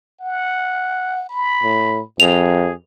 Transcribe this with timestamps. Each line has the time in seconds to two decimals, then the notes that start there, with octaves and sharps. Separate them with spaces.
0.21 F#5
1.29 B5
1.63 A2
2.20 F2 G#4 F7